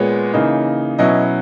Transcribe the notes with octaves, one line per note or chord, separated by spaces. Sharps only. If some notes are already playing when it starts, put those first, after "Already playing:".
Already playing: A#2 G#3 B3 C#5
C#3 E3 A#3 D#4
B2 F#3 C#4 E4 D#5